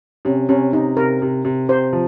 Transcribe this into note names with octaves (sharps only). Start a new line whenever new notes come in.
C3 C#4
C3 C#4
C3 D#4
C3 A#4
C3
C3
C3 C5
F3